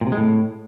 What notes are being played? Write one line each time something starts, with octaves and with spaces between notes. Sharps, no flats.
A#2
C3
G#3
A2